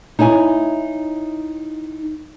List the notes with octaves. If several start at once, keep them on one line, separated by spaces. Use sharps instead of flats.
D#4 E4 C#5 G#5